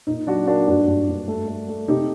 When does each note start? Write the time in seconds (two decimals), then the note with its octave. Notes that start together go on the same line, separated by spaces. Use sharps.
0.07 A#2 D#4
0.27 F#3 D4 F#4
0.47 A#3 D4 F#4
0.68 G2 D4 F#4
0.88 G2
1.09 G2
1.28 A3
1.48 A3
1.68 A3
1.88 C3 D#4 G4